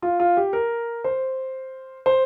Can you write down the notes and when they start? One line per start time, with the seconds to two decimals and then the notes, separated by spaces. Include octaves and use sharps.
0.02 F4
0.20 F4
0.37 G4
0.53 A#4
1.04 C5
2.06 C5